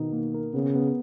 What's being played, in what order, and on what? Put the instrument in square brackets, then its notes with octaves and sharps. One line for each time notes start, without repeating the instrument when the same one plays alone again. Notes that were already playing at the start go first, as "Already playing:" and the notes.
Already playing: [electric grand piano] B2 D#4 [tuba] D#3
[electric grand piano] A#3
A#4
[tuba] C#3 [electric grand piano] B3
[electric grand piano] B3